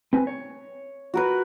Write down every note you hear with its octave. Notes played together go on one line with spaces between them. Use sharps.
C4 B4 G#5
C#5
F#4 A#4 B4